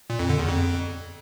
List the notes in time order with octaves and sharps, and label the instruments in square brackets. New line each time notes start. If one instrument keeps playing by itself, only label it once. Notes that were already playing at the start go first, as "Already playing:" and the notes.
[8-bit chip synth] A#2
F2
D3
E2
F2